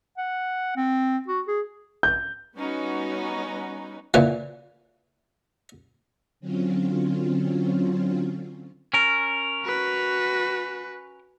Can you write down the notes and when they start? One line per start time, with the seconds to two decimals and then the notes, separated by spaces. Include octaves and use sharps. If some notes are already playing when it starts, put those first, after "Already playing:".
0.18 F#5
0.76 C4
1.28 F#4
1.48 G#4
2.03 G6
2.56 G3 B3 C#4 D#4 F#4
4.14 A#2 C#3 E3
6.40 D3 F#3 C4 C#4 F4
8.94 C#4 A#4
9.64 F#4 B4